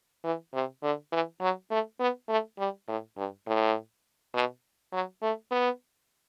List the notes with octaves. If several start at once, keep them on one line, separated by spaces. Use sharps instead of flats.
E3
C3
D3
E3
F#3
A3
B3
A3
G3
A2
G2
A2
B2
F#3
A3
B3